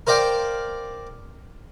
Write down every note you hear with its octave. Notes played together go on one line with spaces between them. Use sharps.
A#4 C5 D5 F5 G5